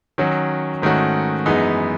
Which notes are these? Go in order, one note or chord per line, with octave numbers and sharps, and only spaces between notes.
D#3 F#3 C#4 F#4
G#2 D#3 A3 C#4 F#4
F#2 E3 G#3 B3 D#4